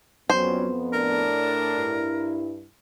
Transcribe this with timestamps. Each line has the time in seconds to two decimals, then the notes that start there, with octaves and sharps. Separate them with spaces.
0.30 F2 F#3 G3 B3 C#4 C5
0.93 A2 D4 A#4
1.76 G2 E4